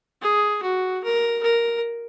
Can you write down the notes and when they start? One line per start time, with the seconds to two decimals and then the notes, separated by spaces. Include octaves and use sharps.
0.22 G#4
0.62 F#4
1.04 A#4
1.43 A#4